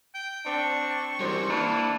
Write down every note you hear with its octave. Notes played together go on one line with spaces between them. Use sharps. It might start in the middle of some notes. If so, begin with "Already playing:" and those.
G5
C4 D4 C#6
F#2 E3 G3 C5
E3 A#3 D4